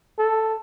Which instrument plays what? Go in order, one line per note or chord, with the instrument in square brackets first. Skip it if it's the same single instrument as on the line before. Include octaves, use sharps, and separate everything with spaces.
[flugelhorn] A4